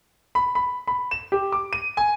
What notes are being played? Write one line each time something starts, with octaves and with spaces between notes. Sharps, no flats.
B5
B5
B5
E7
G4
D6
D#7
G#5